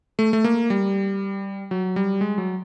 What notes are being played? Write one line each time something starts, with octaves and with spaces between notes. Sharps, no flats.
A3
A3
A#3
G3
F#3
G3
G#3
F#3